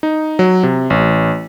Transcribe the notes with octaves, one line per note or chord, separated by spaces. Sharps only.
D#4
F#3
C3
A1